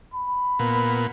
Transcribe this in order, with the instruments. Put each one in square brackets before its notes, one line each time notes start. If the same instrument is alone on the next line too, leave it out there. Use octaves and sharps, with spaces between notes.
[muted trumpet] B5
[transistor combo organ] A#2 B3